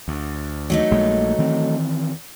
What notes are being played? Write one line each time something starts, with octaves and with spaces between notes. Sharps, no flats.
D2
F#3 A3 D#4
A#1 G#3 A#3
D#3 E3 C4